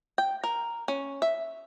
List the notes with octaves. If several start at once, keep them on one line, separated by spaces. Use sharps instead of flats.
G5
A#4
C#4
E5